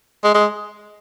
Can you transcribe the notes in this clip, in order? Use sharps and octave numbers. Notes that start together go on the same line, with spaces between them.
G#3
G#3